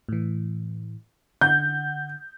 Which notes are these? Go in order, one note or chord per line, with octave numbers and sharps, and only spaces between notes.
A2 E3
D3 F#5 G6